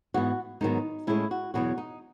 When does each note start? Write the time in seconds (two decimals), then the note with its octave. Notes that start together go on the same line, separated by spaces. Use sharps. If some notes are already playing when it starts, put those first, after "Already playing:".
0.14 G#2 E3 B3 F#4
0.61 G#2 D#3 F#3 B3 D#4
1.07 A2 G#3 C#4 E4
1.31 F#4
1.54 E2 B2 F#3 F#4
1.78 D#4